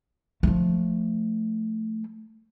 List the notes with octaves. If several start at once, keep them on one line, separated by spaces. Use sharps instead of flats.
F3 A3